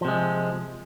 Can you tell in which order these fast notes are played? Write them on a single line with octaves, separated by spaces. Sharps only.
F3 C3 G#3